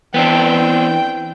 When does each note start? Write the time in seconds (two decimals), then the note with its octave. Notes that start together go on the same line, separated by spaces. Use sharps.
0.14 E3 B3 C4 D4 G5